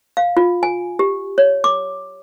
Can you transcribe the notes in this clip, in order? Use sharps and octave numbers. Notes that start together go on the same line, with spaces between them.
F5
F4
G#5
G4
C#5
D6